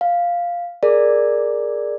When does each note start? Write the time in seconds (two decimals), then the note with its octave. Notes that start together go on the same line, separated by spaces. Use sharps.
0.01 F5
0.83 G#4 A#4 D5